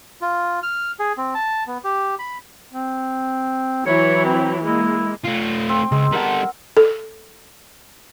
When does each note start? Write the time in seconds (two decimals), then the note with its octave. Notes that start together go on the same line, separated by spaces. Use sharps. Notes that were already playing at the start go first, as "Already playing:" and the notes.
0.21 F4
0.63 F6
0.99 G#4
1.17 C4
1.35 A5
1.67 B3
1.84 G4
2.19 B5
2.73 C4
3.86 E3 F#3 E4 C#5
4.25 C4
4.63 G#3 A#3 E4
5.24 A3 F4
5.69 C4
5.92 C#2 G#3
6.12 G3 A4 A#4 F#5
6.77 A4